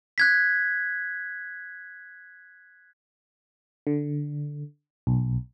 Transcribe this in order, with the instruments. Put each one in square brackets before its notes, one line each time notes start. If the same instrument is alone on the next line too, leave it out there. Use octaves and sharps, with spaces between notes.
[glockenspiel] F#6 G#6 B6
[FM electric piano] D3
B1